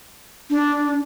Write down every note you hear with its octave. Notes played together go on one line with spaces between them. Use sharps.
D4